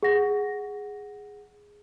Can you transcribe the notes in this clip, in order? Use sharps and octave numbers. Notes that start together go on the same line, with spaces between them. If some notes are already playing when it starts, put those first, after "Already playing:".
G#4 F#5 A#6